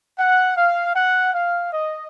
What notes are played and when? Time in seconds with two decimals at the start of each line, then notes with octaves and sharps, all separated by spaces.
0.19 F#5
0.56 F5
0.95 F#5
1.33 F5
1.72 D#5